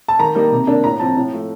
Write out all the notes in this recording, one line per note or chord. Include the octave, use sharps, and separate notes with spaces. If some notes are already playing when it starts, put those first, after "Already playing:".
A5
D#3 A#5
G3 A#3 D#4
C3
D#3 A#3 D4
A2 A#5
F3 C4 A5
A2
F3 A3